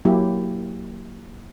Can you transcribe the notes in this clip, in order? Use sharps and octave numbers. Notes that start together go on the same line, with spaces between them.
F#3 A#3 E4 G4